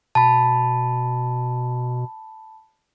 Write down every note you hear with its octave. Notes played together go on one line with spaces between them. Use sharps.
B2 A5 B5